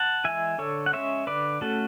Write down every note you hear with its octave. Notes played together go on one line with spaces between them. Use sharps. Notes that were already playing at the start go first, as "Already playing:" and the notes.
Already playing: F#5 A5
E3 G#3 E5 G#5
D3 A4 C#5
F#5
G#3 C#4 C#5 E5
D3 B4 D5
A3 C#4 F#4 A4